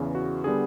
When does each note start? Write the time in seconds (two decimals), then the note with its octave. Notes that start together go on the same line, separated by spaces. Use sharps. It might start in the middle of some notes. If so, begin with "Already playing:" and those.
Already playing: E2 C#3 E3
0.15 F#4
0.44 D3 G3 B3 G#4